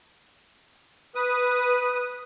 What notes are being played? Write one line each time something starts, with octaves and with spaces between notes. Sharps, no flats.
B4 D#6